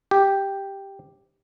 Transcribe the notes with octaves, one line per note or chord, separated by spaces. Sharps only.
G4